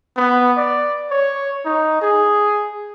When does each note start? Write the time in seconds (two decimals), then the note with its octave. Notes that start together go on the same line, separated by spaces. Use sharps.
0.17 B3
0.57 D5
1.10 C#5
1.65 D#4
2.02 G#4